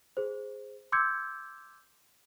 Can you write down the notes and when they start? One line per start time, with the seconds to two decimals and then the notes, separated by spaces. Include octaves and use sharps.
0.17 G#4 C5
0.92 C6 D6 E6 G6 G#6 C#7